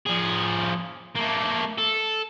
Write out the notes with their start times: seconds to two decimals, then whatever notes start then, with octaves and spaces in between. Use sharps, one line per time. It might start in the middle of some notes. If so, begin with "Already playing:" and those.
0.06 F3 G#4
1.15 A3 A#3
1.78 A4